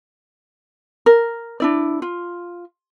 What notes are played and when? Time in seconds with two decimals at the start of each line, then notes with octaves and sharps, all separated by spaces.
1.06 A#4
1.60 D4 E4 D5
2.02 F4